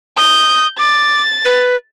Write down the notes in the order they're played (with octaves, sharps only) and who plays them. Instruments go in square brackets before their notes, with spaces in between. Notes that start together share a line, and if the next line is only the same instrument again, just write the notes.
[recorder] D#6 [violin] G6
[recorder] D6 [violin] A6
[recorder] B4